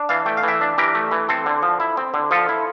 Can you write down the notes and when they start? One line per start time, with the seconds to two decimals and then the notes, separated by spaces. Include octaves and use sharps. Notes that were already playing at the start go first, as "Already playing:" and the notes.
Already playing: D4
0.09 E3 F5 A5
0.26 A3 G5
0.37 F5
0.43 E3
0.48 E5 G5
0.61 D4
0.78 E3 G4 A#4
0.95 A3
1.11 E3
1.29 C4 A4 C5
1.46 D3
1.62 F3
1.80 E4
1.97 C4
2.14 D3
2.31 F3 F4 A4
2.49 E4